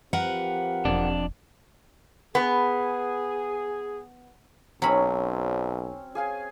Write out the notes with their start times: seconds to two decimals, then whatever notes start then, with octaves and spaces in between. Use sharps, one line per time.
0.13 F3 C4 G4 A#4 B4 F#5
0.85 E1 F2 D4
2.35 B3 G#4
4.82 B1 F#3 C4 C#4 B5
6.15 G#4 F5 G#5